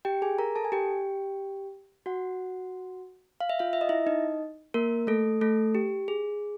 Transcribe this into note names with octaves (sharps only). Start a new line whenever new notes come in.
G4 G5
G#4 G#5
A#4 A#5
A4 A5
G#5
G4 G5
F#4 F#5
F5
E5
F4 F5
E5
D#5
E4 E5
D#4 D#5
A#3 A#4
A3 A4
A3 A4
G4
G#4